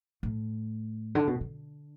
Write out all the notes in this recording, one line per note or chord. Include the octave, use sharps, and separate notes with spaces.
A2
D3
B2
D3